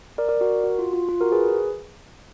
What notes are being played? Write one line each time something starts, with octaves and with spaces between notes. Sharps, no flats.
A#4 D5
A#4 D5
F#4 A#4
F#4
F4
F4
F4
F#4 A#4
G#4 B4